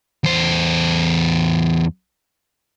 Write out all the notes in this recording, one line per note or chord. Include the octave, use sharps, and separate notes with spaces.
E2 C5